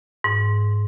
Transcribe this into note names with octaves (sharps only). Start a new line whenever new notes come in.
G#2